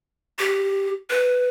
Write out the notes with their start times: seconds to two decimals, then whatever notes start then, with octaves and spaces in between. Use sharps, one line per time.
0.39 G4
1.10 B4